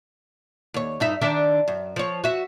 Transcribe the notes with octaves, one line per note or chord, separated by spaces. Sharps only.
D#2 C#5
G2 D#4 E5
D#3 D4 E5
F#2
F3 C#5
F#4 E5